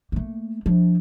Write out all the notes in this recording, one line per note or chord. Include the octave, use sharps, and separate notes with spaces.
A3 A#3
F3 D4